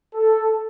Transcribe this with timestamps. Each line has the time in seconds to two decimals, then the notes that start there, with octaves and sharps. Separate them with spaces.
0.14 A4